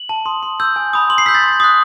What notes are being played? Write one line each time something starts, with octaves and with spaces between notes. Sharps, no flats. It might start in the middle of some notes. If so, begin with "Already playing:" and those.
Already playing: F#7
A5
C6 D#6
C6
E6 G6
G#5
B5 D#6
C6 F#7
C7
E6 G6 B6
A6
C6
D#6 F#6